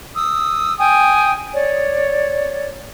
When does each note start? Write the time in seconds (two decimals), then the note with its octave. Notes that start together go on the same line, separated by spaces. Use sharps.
0.15 D#6 E6
0.79 G5 G#5 D#6
1.55 C#5 D5